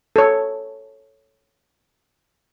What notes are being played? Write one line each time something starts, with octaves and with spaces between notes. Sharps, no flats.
A4 C#5